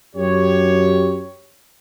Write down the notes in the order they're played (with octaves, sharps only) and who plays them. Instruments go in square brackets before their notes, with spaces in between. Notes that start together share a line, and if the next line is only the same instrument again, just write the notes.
[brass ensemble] F#2 G4 C#5